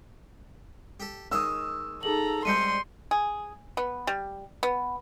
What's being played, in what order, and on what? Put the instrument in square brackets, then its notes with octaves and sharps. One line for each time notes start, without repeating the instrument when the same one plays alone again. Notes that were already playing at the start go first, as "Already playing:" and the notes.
[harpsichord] G4 A4
[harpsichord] D#3 G#3 C#5 [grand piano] D#6 E6
[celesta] D#4 G#4 F#7 [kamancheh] A4 A#5
[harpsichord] G3 G#3 C4 [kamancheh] C6 [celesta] G6 C#7 D#7
[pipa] G#4
B3
G3
B3